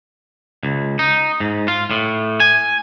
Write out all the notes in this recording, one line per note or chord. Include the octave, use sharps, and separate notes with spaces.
C#2
D#4
G#2
F4
A2
G#5